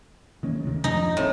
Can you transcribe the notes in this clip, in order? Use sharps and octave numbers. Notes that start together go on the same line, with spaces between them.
D#3 A#3 C#4
D2 C3 D#3
F2 F3 D#4
G1 A2 C4